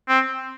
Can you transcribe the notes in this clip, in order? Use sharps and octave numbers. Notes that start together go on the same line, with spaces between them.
C4